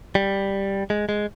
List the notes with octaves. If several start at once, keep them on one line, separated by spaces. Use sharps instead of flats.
G3
G#3
G#3